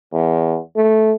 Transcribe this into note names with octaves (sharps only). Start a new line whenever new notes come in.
E2
A3